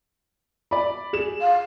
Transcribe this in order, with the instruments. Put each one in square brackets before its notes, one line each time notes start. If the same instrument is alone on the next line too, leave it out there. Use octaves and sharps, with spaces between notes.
[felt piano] D5 B5
G#4 E7
[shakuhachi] F5